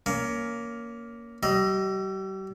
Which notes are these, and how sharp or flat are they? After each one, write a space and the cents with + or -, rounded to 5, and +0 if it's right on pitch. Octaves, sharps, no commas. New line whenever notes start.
A#3 +0 C#4 +20
G3 -40 D#5 +10